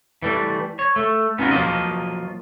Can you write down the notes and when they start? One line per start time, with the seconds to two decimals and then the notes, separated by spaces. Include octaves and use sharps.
0.22 E3 G3 A3
0.79 C#5
0.96 A3
1.38 B3 C#4 D#4 F4 F#4
1.51 F3 F#3 A#3 F4 D#5